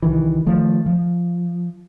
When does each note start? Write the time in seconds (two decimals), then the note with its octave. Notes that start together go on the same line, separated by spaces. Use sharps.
0.02 C2 D#3 E3
0.46 D#3 F3 A3
0.86 F3